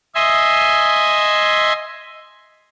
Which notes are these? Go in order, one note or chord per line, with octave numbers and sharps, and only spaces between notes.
D#5 E5 G#5 C6